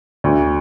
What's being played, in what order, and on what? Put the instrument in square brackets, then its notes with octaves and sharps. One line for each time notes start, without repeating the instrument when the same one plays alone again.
[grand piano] D2